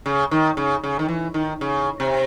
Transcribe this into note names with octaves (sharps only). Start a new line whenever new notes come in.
C#3
D#3
C#3
C#3
D#3
E3
D#3
C#3
C3